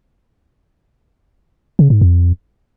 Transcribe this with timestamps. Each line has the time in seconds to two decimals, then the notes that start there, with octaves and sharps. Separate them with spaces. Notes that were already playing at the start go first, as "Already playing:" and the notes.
1.79 C#3
1.90 G#2
2.01 F2